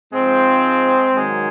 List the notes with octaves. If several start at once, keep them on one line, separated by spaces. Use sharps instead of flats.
G#2 F3 G#3 C4
G#2 D#3 F#3 G#3